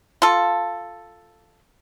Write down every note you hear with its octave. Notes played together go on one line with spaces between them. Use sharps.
F4 A4